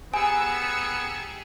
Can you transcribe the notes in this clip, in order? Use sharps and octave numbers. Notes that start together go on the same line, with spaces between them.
B3 G4 G#4 G#5 A#5 E6 C#7